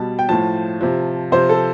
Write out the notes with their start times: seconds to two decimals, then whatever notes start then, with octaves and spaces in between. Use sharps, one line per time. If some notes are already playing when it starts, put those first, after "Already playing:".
Already playing: B2 G3 A5
0.19 G5
0.29 A2 F3 A5
0.81 C3 F3
1.32 C3 F3 C5
1.49 A4